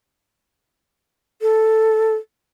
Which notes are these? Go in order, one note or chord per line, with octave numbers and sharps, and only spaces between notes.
A4